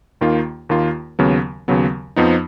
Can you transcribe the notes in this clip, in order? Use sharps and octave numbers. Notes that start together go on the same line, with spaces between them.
D#2 D#3 A#3 F4
D#2 D#3 A#3 F4
D#2 C#3 F#3 B3
D#2 C#3 F#3 B3
F2 F3 B3 D#4